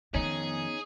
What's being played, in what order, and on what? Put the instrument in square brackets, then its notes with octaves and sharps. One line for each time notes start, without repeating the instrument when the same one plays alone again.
[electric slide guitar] F2 D#3 C#5 [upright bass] B3 [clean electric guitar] C#4 D#4 [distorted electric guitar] G#4